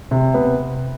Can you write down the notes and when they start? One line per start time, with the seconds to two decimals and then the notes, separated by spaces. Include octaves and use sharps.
0.11 C3
0.34 B3